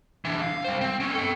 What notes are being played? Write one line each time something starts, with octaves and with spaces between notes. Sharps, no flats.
E3 D4
F5
G3 C5
C4
C4 C#4
A4 G5